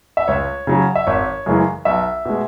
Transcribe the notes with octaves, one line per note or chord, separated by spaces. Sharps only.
E5
C#2 C#5
C#3 F#3
E5
G#1 C#5
F#2 C#3 E3 G#3
B1 E5
B2 G#3